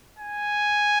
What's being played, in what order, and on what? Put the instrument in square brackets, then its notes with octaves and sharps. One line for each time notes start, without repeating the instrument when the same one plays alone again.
[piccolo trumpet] G#5